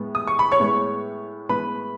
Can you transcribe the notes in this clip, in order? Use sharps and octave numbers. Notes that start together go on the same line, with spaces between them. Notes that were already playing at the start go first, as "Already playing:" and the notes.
Already playing: A2 G#3 B3
D#6
C#6
B5
C#5 C#6
A2 G#3 B3
A2 G#3 B3 B4 B5